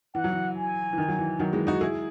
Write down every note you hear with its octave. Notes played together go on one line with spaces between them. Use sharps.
E3 F#5
F#3
E3
G#5
E3
D#3
F#3
E3
D#3 F#3
E3 G#3
D#4 F#4
E4 G#4